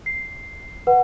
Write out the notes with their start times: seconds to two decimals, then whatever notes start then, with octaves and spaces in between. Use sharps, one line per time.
0.06 C7
0.87 B4 F#5